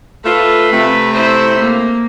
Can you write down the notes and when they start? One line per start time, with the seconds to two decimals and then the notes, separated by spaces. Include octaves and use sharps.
0.24 A3 F4 B4
0.72 C3 A3
1.14 E4 C5
1.59 A#3